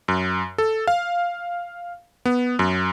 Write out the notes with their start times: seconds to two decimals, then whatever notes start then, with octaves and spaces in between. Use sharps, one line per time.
0.08 F#2
0.58 A4
0.87 F5
2.25 B3
2.59 F#2